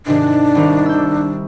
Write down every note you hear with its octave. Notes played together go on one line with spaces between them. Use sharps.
G#2 C3 D#3 D4
C2 D#3 A#5
E6 G6